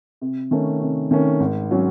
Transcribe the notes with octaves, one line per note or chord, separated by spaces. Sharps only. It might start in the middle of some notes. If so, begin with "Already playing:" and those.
C3
D#3 A3 C#4
C3
D#3 A3 C#4
G#1
F#3 C#4